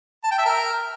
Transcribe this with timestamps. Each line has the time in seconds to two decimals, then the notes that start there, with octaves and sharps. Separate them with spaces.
0.24 A5
0.31 G5
0.39 E5
0.46 A#4